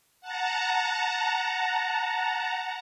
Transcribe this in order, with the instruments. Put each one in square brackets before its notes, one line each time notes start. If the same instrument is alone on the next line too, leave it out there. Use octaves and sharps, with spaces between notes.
[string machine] F#5 A5 A#5